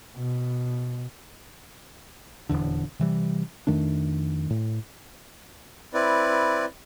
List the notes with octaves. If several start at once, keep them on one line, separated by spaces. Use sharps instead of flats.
B2
D#1 G#1 E2 D3
C3 E3 G3
F2 D#3 A3 D4
A2
C4 E4 B4 D5